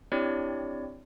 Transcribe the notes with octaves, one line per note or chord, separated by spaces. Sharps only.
C4 D4 E4 G4 C#5 D5